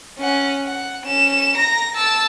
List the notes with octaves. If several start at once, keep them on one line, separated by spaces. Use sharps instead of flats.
C#4 F#5
F#5
C#4 E7
A#5 A#6
A5 E6